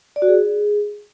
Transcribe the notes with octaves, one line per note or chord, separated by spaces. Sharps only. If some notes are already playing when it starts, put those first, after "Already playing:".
D5
F#4
G#4